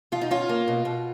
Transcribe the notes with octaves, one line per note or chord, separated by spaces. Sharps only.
B2 F4
D#4
C#4 F4
A#3
B2
B2